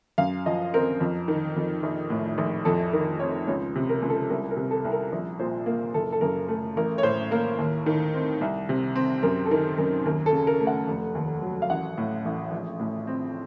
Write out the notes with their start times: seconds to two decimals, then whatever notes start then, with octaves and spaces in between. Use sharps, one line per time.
0.18 F#2 F5
0.46 F3 D#5
0.74 C4 A#4
1.01 F2
1.28 D#3
1.56 F2
1.83 A#1
2.10 A2
2.38 A#1
2.65 F2 A4
2.93 D#3 A#4
3.19 C4 C#5
3.47 C#2 C#5
3.75 C3
3.89 A#4
4.02 C#2
4.10 A4
4.30 C2 A#4
4.51 A#4
4.57 C3
4.71 A4
4.85 C2
4.92 A#4
5.12 A#1
5.39 A#2 C5
5.66 A#3
5.94 F#1 A4
6.12 A4
6.21 F#2 A#4
6.48 A3 A4
6.77 A1 A#4
6.98 C#5
7.03 A2 C5
7.31 A#3 A#4
7.58 D#2
7.86 D#3
8.14 C4
8.41 C2
8.69 C3
8.96 C4
9.23 F#2 A#4
9.45 A4
9.51 D#3 A#4
9.78 F#2 A#4
10.05 D#2 A#4
10.26 A4
10.33 C#3
10.47 A#4
10.60 A3
10.67 F#5
10.88 F1
11.15 D#2
11.42 F#3
11.62 F5
11.70 A1 F#5
11.98 A2
12.25 A1
12.52 A#1
12.80 A2
13.07 C4